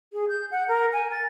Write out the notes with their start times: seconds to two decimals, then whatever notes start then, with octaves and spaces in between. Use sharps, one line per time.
0.13 G#4
0.29 G6
0.51 F#5
0.68 A#4
0.93 G#5
1.12 A6